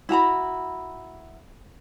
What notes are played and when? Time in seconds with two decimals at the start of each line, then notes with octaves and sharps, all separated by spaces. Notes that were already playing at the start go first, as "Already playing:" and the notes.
0.09 E4 F#4 A#5 B5